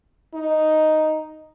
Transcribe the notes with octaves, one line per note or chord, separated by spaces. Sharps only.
D#4